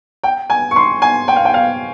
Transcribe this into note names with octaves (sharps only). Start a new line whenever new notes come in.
G5
G#5
C#6
C6
G#5
G5
F5
G5
F5